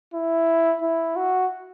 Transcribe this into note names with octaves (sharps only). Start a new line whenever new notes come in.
E4
E4
F#4